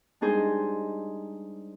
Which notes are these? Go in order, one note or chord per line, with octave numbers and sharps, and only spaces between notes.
G3 G#3 D4 D#4 G#4 C5